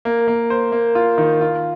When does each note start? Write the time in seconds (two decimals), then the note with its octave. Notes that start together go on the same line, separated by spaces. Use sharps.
0.05 A#3
0.28 A#3
0.50 C5
0.72 A#3
0.95 F4
1.18 D#3
1.41 F4